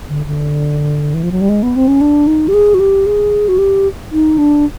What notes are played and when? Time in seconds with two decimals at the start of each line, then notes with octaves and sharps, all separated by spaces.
0.09 D3
0.26 D3
1.14 E3
1.23 F3
1.32 F#3
1.41 G3
1.49 G#3
1.63 B3
1.76 C4
1.88 C#4
2.01 D4
2.27 D#4
2.48 G4
2.54 G#4
2.74 F#4
2.80 G4
3.06 G#4
3.48 F#4
3.58 G4
4.12 D#4
4.38 D4